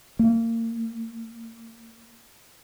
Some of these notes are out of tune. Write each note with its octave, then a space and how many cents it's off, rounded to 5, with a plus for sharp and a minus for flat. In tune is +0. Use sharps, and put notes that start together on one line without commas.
A#3 -30